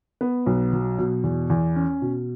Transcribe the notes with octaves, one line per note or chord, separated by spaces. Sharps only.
B3
B1
F#3
B2
E2
E2
C#4
B2